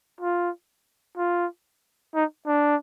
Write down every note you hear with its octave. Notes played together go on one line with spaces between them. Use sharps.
F4
F4
D#4
D4